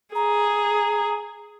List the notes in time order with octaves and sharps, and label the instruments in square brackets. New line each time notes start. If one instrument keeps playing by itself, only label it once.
[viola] G#4 [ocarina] A#5